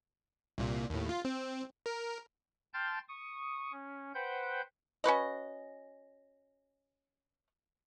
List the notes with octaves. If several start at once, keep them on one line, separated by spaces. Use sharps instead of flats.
C2 A#2
D#2 A2
F4
C4
A#4
G5 A5 C6 F6 G6 A6
C#6 D#6
C#4
B4 C5 F#5 G5 G6
C#4 F#4 B4 D#5